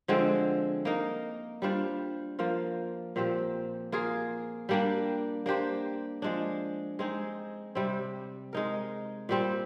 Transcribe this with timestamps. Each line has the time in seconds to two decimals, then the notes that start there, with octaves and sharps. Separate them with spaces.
0.08 D3 F3 G#3 C4
0.85 A#3 D#4 A#4
1.62 G3 D4 F4 C5
2.39 F3 A#3 F4
3.16 A#2 F3 C4 G4
3.92 A#3 F4 G#4
4.69 G3 A#3 D4 G4
5.46 A#3 D4 G4 C5
6.22 F3 G#3 D4
6.99 G#3 C4 D#4 G#4
7.75 C3 G3 C4
8.53 G#3 D#4 A#4
9.29 A#2 G3 C4